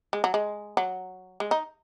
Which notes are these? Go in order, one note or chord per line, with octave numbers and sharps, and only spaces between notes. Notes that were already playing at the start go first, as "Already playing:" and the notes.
G#3
F#3
G#3
F#3
G#3
D#4